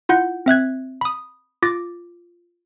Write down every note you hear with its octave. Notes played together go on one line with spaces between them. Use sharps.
E4 F4 F#5 G6
C4 E5 F#6 G#6
B5 D#6
F4 D6 A6 A#6